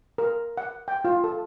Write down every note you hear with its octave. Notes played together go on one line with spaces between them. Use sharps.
A#4
F#5
G5
F4
A4